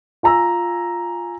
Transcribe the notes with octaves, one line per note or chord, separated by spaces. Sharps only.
F4 G#5 A#5 E6